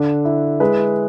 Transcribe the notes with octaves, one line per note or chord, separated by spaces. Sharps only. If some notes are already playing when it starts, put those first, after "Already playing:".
Already playing: D3 D4
E4
G#3 B4